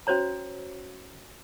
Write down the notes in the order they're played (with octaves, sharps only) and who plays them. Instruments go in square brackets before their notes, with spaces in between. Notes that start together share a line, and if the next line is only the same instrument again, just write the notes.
[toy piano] C#4 F#4 C5 C#5 A#5